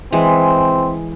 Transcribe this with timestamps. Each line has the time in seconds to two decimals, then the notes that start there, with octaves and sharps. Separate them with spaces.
0.13 E3 G#3 C4